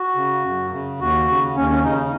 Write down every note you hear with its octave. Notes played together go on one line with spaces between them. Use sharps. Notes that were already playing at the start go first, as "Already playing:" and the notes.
Already playing: F#4
C#3
F#2
C#3
D#2 F#4
C#3
D#2 C#4
C#4
C#3 D#4